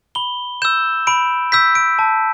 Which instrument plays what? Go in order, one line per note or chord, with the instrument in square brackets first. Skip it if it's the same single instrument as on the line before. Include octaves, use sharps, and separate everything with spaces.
[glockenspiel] B5 G7
E6 G6 E7
B5 D7
E6 G6 B6
D7
A5